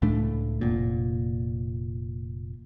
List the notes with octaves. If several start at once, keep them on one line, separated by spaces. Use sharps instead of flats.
C#2 A2 A3 D4
F1 A#2